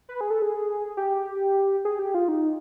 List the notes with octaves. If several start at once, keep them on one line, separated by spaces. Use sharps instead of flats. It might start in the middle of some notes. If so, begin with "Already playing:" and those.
B4
G#4
A4
G#4
G4
G#4
G4
F4
D#4